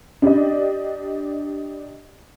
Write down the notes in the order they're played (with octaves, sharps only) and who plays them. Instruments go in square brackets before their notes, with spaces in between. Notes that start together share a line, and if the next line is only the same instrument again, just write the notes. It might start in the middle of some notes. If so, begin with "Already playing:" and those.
[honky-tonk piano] D4 G4 D5 D#5